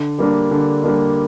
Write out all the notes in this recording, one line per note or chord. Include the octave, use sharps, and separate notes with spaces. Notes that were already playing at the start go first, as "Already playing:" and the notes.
Already playing: D3
G3 A#3 D4
D3
G3 A#3 D4